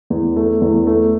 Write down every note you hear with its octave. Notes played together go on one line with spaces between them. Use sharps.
E2
A3
E2
A3